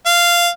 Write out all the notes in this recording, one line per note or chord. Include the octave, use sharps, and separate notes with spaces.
F5